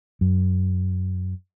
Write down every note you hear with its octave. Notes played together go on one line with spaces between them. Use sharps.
F#2